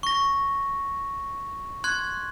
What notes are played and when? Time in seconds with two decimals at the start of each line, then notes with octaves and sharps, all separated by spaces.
0.03 C#6 A#6
1.84 C6 F#6 G#6